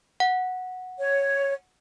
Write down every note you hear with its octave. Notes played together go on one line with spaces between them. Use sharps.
F#5
C#5